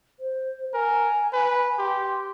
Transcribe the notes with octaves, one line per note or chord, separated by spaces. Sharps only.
C5
A#4 G#5
B4
G4 C6